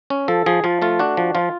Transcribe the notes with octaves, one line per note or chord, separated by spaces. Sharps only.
C#4
F3 A4
F3 G#4
F3 F4
A3 F4
D4 F#4
F3
F3 F4